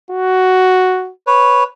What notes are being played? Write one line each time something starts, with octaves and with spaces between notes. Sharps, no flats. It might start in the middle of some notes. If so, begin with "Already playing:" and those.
F#4
B4 C#5